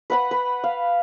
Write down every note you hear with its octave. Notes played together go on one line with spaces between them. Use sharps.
B4 F#5 B5
B4
F5